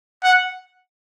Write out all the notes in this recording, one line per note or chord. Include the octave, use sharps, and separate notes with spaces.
F#5